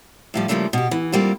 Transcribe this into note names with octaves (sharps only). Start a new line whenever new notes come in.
A2 F3 G3
C#3 E3 F3 G3 A3 A#3
B2 G4
E3
G3 A#3 C4 F4